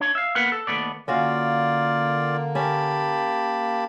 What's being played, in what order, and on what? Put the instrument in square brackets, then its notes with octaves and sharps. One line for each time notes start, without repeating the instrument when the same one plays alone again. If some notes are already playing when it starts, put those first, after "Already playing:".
[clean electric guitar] D4 C#5
E5 F5
A#3 B3 A#4 B4 F#5
A4
D#2 D#3 A3 B3 D5
[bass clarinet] D3 [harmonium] A#3 [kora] C#4 F#4 F5 [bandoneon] F4 D5
[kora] C#4 [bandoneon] G4 A5 B5